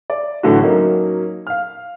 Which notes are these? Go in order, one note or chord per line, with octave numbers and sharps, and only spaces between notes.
D5
A2 D3 E3 F#3 F#4
F#3 A#3 C#4 D#4
F5 F6